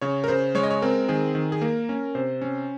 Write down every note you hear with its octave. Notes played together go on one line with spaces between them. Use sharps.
C#3 C#5
A#4
C#3 C5
G#3 C#5
D#5
C#5
C4 A#4
D#3 G#4
D#3
G#4
A#3 A#4
C#4
C3 C5
C#4